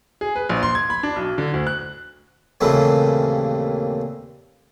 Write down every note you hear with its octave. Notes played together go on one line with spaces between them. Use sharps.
G#4
B4
A#1
C6
G#6
B5
D4
B1
D3
D2
F#6
D#2 A#2 C#3 E3 A3 C4